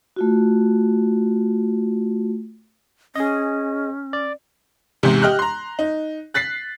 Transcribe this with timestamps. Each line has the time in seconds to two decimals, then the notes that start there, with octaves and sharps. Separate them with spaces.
0.16 A3 F4 F#4
3.16 C#4 G#4 D#5
4.13 D5
5.03 E2 G#2 C3
5.22 G4 D#5 F6 F#6
5.39 A#5 C6
5.79 D#4
6.34 F#6 A6 B6 C7